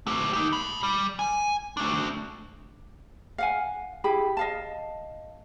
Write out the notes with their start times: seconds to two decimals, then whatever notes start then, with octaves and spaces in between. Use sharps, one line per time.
0.07 A3 G4
0.33 D#4 G4
0.53 A5 B5
0.83 G3
1.19 G#5
1.77 A3 D4
3.38 F5 F#5 G#5
4.04 E4 G4 G#4 B5
4.37 D#5 F5 A5